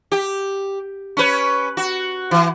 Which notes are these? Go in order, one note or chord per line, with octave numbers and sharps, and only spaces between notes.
G4
C#4 B4
F#4
E3